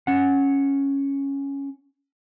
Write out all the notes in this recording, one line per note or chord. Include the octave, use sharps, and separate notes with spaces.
C#4 F#5